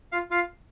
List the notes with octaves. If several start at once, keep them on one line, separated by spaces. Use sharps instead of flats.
F4 F5
F4 F5